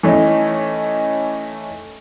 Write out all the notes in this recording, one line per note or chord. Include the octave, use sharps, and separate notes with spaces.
E3 A3 C#4 D#4